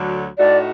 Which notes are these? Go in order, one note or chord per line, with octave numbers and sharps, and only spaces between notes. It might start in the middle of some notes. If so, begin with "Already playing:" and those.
Already playing: D2 D3 F#3
A2 A3 D#4 F#4 D5